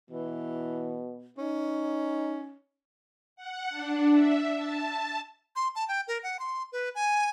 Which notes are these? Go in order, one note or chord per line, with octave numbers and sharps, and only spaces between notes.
B2 E3
C#4 D#4
F#5
D4
E5
A5
C6
A5
G5
A#4
F#5
C6
B4
G#5